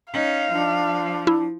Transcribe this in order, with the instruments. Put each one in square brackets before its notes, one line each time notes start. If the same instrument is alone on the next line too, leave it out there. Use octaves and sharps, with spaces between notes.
[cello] C#4 D#4 [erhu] F5
[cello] F3 [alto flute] D4
[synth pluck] E4